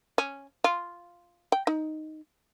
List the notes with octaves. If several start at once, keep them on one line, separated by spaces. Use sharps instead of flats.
C#4
F4
G5
D#4